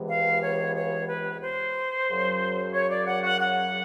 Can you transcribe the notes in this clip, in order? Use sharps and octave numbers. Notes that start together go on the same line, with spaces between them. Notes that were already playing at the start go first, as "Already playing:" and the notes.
Already playing: C#2 C3 E3 G#3 B3
F5
C#5
C#5
B4
C5
F#2 C#3 F#3
C#5
D5
F#5
F#5
F#5